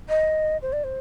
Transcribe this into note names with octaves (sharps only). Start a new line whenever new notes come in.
D#5
C5
D5
C5